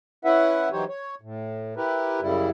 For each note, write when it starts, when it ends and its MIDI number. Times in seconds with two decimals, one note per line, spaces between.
0.25 0.69 61
0.25 0.69 64
0.25 0.69 71
0.25 0.69 76
0.25 0.69 78
0.72 0.84 52
0.72 0.84 54
0.72 0.84 63
0.72 0.84 67
0.72 0.84 72
0.72 0.84 73
0.89 1.15 73
1.21 1.74 45
1.77 2.20 64
1.77 2.20 67
1.77 2.20 70
1.77 2.20 71
2.21 2.50 42
2.21 2.50 49
2.21 2.50 55
2.21 2.50 64